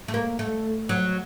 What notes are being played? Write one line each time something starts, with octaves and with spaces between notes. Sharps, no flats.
A3
A#3
A3
F#3